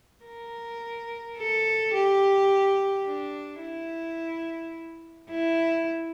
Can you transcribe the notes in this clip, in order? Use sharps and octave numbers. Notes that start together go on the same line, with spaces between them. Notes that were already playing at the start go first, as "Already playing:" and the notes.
A#4
A4
G4
D4
E4
E4